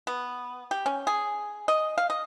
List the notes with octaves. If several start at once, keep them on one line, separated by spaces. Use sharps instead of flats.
B3
G4
C#4
G#4
D#5
F5
D#5